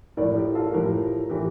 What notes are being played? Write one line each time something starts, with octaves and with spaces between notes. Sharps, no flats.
A2 F3 A#4 D5
G4 A#4
F4 A4
A2 F3 G4 A#4
A2 E3 G4 A#4